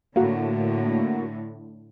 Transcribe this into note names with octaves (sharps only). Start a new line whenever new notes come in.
A2 D3 A#3 F#4